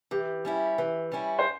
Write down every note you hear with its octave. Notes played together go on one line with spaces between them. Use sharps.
E3 G4
G3 C#4 E4
E3
G3 C#4 E4
C5